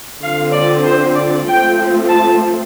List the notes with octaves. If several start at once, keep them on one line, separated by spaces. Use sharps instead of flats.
D3 F3 C4 F5
D5
C5
D5
F3 A3 C4 G5
A5